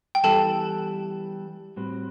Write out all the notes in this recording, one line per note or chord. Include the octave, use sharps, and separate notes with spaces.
G5
E3 G3 B3 E4 A4 A5
A2 G3 C4 F#4 B4